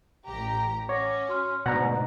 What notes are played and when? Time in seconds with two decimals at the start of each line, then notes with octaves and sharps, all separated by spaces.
0.25 A1 G4 A#5
0.89 C#4 C#5 F#5 D6 A#6
1.28 F#4 C6 F6
1.66 D2 G#2 B2 D5 F#5 A#5